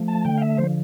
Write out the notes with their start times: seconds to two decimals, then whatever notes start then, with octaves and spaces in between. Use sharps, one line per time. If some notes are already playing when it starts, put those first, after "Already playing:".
Already playing: F3 A3
0.08 A5
0.25 D3 G5
0.38 F5
0.42 E5
0.58 F3 C5